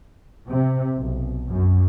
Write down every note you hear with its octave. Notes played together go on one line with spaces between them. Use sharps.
C3
B1
F#2